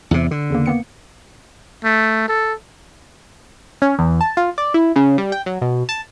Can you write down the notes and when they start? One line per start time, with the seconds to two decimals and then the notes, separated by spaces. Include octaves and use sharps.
0.11 E2 C3
0.31 D3
0.50 E2 C#3 A#3
0.66 A#3 B3 C#7
1.84 A3
2.28 A4
3.82 C#4
3.99 E2
4.21 A5
4.37 F4
4.58 D5
4.74 E4
4.96 C#3
5.18 G3
5.32 G5
5.46 F#3
5.61 B2
5.89 A5